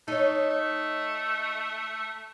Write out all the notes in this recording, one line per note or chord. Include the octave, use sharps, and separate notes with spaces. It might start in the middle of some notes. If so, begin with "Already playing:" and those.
A3 D#4 C#5
A3